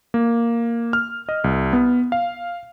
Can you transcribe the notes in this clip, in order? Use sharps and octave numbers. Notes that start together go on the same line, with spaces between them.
A#3
F6
D#5
C2
B3
F5